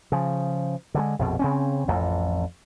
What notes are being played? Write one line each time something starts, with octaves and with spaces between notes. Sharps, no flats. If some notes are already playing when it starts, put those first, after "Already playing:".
C#3 F3
D3 F#3 G#3
A#1 F2 B2
C#3 C4 C#4
A1 F2